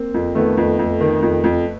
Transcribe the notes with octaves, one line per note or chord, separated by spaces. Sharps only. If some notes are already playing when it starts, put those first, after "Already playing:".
Already playing: A#3 C4
F2
D#3 A3 B3
F2
F2
D#3
F2
F2